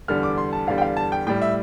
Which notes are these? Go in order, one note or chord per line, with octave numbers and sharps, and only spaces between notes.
E2 D3 G3 F6
D6
C6
A5
E2 D3 G3 F5
G5
F5
A5
G5
A2 G3 G5
E5